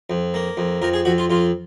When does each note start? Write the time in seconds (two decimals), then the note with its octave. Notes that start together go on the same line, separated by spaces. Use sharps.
0.10 F2
0.34 A#3
0.57 F2
0.82 F2 A#4
0.93 G#4
1.05 F2 F#4
1.18 F4
1.30 F2 F4